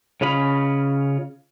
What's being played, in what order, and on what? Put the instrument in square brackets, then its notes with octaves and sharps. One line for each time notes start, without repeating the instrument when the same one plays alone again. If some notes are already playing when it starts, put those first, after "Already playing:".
[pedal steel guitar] C#3 C#4 F4 D#5 B5